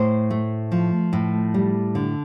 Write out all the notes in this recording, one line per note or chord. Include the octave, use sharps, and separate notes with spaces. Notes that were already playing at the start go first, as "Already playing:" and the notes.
Already playing: A2 C5
A3
F3
A2
G3
D3